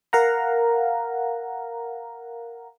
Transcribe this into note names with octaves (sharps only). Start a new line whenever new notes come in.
A#4 F5 F#5 A#5